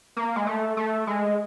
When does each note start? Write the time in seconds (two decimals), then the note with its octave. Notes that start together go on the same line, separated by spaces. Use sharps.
0.17 A#3
0.36 G#3
0.47 A3
0.77 A3
1.07 G#3